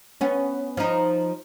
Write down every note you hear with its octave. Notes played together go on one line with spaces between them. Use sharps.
B3 C#4
F3 D#4